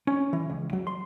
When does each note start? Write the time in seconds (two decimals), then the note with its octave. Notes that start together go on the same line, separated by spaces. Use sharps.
0.07 C#4
0.33 E3
0.50 C#2
0.73 F#3
0.87 C6